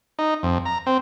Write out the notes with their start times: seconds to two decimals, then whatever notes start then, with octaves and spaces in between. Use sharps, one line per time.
0.19 D#4
0.43 F2
0.65 A#5
0.86 C4